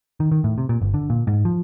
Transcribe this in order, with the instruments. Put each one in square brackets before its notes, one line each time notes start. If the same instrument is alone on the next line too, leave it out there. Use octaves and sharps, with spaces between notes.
[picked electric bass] D#3
D#3
A2
C3
A#2
G1
D3
A#2
G#2
F3